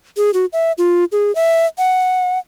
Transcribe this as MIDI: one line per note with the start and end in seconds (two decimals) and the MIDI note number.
0.17 0.30 68
0.34 0.46 66
0.53 0.72 76
0.78 1.04 65
1.12 1.34 68
1.35 1.66 76
1.78 2.39 78